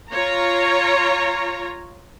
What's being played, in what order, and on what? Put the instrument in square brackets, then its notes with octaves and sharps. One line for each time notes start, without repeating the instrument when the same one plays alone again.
[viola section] F4 C#5 A#5